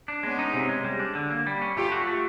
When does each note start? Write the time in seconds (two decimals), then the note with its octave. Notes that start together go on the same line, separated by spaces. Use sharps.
0.08 D4
0.23 G#3 B3 C#4
0.39 D#4
0.54 C3
0.69 G#3
0.84 G3
0.99 D4
1.15 D3
1.30 A#3
1.47 G3
1.61 C#4
1.77 A3 F4 G4
1.92 F#4
2.07 A3